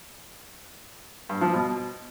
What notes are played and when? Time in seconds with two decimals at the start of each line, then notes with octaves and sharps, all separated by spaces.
1.29 G2
1.41 F3
1.53 B2